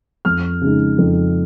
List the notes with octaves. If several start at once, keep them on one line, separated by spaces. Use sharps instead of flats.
F2 F6
C#3 G#3 D#4
F2